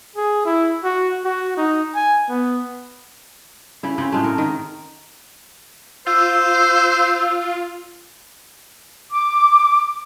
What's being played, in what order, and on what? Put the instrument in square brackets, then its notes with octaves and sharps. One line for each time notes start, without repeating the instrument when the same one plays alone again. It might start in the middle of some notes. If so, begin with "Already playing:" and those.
[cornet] G#4
E4
F#4
F#4
D#4
G#5
B3
[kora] C#3 E4
C#3 C4
A2 G#3 A3
A#4
D#3
[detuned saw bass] F4 [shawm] C5 [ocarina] E6
[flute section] D6